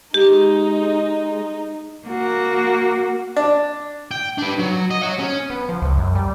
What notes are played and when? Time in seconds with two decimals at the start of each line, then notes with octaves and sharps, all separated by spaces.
0.14 G#3 D#4 G4
2.08 A#3 F#4
3.36 D4
4.11 G5
4.38 D4 B4
4.59 F#3
4.91 D#5
5.03 C#5 F#5
5.19 C#4
5.50 B3
5.69 F3
5.82 C#2
5.97 F#2
6.15 G3